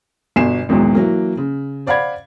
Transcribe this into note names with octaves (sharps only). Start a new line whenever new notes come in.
G1 B2 G#5 C7 E7
G#1 E2 G#2 B2 D#3 F#3
E3 F#3 A#3
C#3
C5 D5 F5 F#5 B5 G#6